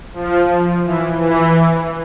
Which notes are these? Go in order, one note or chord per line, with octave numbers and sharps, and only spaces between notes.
F3
E3
E3